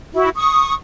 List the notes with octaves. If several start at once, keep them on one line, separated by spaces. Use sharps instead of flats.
E4 F#4
C#6 D#6